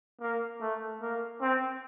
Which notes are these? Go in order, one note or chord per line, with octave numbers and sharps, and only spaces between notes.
A#3
A3
A#3
C4